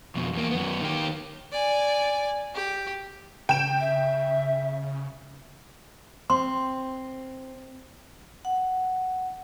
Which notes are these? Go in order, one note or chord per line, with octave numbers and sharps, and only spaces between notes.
F2 B2
E2 A#3
F#2 B3
D#3 G4
D5 G#5
G4
C#3 G5 E7
E5
C4 C6
F#5